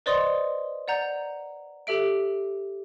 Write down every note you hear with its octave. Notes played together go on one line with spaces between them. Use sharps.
B4 C5 D5 D#5 C6 D#6
D5 F#5 A#5 G6
G4 A4 E5 D7